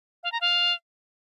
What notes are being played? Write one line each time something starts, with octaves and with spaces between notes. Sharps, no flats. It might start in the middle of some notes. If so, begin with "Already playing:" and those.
F5
A#5
F5